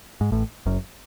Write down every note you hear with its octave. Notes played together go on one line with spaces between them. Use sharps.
G#2
A1 A2
F#1 F#2